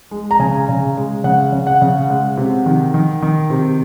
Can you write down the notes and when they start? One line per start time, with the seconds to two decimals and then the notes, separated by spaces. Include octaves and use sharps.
0.11 G#3
0.31 A#5
0.39 C#3 G#5
0.69 C#3
0.97 G#3
1.24 C#3 F#5
1.52 C#3
1.67 F#5
1.82 C#3
2.10 G#3
2.37 C3
2.66 D#3
2.94 D#3
3.22 D#3
3.50 C3